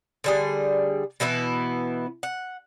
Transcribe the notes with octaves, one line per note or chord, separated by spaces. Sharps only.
D3 G3 G#4
B2 E3 B3 E4
F#5